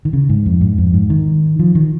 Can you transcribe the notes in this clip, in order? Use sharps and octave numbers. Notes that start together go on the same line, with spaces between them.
D#3
C#3
G#2
F2
G#2
F2
G#2
D#3
F3
D#3